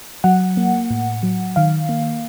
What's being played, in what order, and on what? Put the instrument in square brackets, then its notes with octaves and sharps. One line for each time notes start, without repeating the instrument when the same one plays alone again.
[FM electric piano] F#3 F#5
A#3
A2
F#3
D#3 F5
A#3